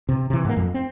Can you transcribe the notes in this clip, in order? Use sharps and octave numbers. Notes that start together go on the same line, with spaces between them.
C3
C3 E3
G#2 A#3
F2
C4